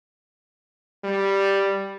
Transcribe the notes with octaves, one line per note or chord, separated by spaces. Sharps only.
G3